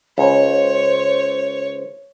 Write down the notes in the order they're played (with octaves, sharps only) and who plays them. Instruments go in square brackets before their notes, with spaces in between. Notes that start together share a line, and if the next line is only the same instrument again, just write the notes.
[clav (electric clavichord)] C#2 [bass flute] C5 [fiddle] C#5